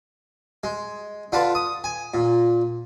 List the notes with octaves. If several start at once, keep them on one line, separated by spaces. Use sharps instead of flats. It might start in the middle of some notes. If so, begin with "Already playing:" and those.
G#3
D3 F4 B4 A5
D#6
G#5
A#2